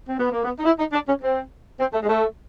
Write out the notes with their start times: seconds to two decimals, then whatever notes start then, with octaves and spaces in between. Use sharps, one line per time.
0.07 C4
0.19 B3
0.32 A#3
0.44 B3
0.58 D#4
0.65 E4
0.79 D#4
0.93 D4
1.07 C#4
1.22 C4
1.79 C4
1.93 A3
2.03 G#3
2.08 A3